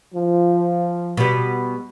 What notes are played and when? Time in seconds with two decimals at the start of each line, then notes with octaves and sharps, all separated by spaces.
0.14 F3
1.17 B2 G3